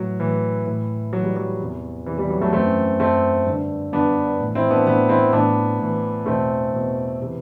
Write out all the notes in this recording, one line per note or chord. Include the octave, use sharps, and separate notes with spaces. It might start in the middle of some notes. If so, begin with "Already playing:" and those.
Already playing: A2 E3 F#3
A2 E3
A2 E3
A2 E3 F#3
G3
F#3
E2 C3 E3
E2 C3 E3
E3 G3
F#3
F#3 A3
F#2 E3 A3 C4
F#2 E3 A3 C4
G2 D3
G2 D3 B3 D4
A2 E3
C4 E4
B3 D4
A2 E3 B3 D4
C4 E4
A2 E3 B3 D4
A2 E3
E2 B2 A3 C4
E2 B2
C3 E3